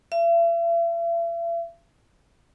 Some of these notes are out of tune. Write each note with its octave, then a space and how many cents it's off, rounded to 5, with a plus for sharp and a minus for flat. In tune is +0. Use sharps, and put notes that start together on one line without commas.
E5 +45